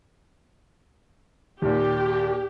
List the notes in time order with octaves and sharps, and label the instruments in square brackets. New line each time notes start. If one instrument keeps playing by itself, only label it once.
[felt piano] D#2 A#2 [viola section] G4